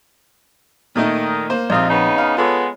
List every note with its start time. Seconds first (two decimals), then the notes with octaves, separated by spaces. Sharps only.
0.96 A#2 D#3 A3 D#4
1.50 A#3 C5
1.70 A#1 C3 C4 D#4 F4 D#5
1.90 C#3 B3 D#4
2.18 F5
2.37 G#3 B3 F4 A4 C#5